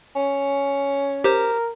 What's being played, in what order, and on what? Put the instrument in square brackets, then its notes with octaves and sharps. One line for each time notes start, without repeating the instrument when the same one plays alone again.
[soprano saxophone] C#4
[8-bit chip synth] G4 C5 [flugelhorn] A#4